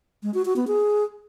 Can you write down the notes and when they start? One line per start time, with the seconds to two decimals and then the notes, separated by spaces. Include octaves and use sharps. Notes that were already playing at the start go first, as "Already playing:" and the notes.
0.23 G#3
0.34 F#4
0.45 F#4
0.56 B3
0.67 G#4